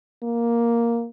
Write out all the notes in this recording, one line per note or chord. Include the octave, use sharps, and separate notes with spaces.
A#3